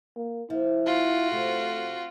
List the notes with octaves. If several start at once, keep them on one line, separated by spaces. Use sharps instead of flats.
A#3
F3 E4
A#3 F4 F#4
C3 A3